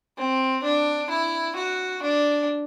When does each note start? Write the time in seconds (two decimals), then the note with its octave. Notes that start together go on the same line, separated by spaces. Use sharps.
0.17 C4
0.63 D4
1.10 E4
1.56 F#4
2.02 D4